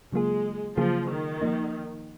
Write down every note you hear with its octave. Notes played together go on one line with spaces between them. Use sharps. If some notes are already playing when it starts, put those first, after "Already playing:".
C#3 F#3 G#3 A#3 F4 G#4
C#3 F3 F#3 A#3 F4 G#4
D#3
F3 A#3 D#4